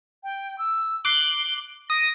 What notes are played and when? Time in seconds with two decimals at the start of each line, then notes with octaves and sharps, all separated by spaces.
0.23 G5
0.58 E6
1.05 D6 F#6 C7 G7
1.90 D#6 A#6 D7